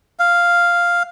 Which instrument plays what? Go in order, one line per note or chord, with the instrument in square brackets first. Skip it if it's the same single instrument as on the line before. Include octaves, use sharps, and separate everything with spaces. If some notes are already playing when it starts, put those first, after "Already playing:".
[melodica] F5